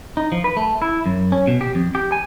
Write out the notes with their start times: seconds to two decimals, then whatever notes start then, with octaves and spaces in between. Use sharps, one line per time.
0.17 D#4
0.32 F3
0.44 B4
0.57 A3
0.82 E4
1.06 F#2
1.32 C#4
1.47 B2
1.61 G4
1.75 F2
1.95 G4
2.12 G#5